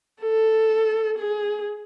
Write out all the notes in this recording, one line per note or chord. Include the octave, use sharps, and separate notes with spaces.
A4
G#4